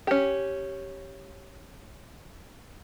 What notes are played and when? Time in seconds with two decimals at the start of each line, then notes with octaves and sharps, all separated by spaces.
0.07 C#4 G4